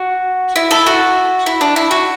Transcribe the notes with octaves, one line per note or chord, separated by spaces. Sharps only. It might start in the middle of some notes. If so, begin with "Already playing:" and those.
Already playing: F#4
E4
E4 A4
F#4
E4
D4
E4
F#4